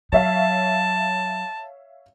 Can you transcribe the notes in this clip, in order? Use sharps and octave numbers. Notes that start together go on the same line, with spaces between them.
F#3 C#5 E5 F5 A5